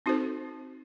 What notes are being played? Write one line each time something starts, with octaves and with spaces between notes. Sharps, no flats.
C4 D#4 F#4 A4 C5